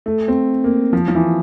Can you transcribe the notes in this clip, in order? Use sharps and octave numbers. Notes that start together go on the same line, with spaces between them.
A3
C4
A#3
F3
F3
E3